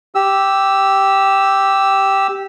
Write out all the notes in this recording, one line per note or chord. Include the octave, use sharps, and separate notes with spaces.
G4 E6